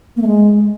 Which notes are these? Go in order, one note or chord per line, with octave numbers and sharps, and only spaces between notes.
A#3
A3
G#3